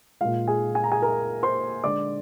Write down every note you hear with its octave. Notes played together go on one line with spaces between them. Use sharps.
A#2 G#3 F4 F5
G#4 G#5
G#5
A#5
G#4 G#5
A#4 A#5
C5 C6
D3 G#3 D5 D6